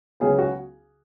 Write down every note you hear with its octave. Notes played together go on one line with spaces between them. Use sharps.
C#2 C#3 F#3 B3 G#4
F#4